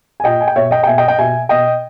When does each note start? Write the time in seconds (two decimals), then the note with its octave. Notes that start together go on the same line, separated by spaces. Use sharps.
0.20 G#5
0.24 A#2 D#5 G5
0.41 G#5
0.48 G5
0.56 B2 C#5 E5
0.71 D#5 G5
0.83 G5
0.87 B2 E5 G#5
0.98 D#5 G5
1.08 D#5 G5
1.19 B2 E5 G#5
1.49 B2 D#5 G5